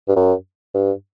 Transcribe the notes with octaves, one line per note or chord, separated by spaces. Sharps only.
G2
F#2
G2